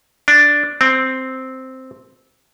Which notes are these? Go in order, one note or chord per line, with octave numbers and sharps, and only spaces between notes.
D4
C4